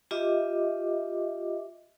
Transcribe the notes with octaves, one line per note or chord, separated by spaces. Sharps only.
F4 G4 D#5 E5 D6